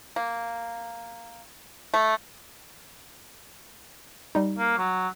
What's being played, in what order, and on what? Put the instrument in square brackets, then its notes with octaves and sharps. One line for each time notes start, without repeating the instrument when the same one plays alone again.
[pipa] A#3
A3
[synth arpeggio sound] G3 D#4
[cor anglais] A#3
F#3